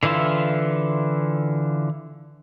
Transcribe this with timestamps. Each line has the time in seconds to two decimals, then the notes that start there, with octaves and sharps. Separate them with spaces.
0.03 D3 E3 E4 F4 E5